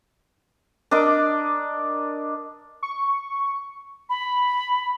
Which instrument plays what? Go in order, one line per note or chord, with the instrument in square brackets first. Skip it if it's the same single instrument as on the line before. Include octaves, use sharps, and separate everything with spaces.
[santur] D4 A#4 D#5 D6
[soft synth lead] C#6
[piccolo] B5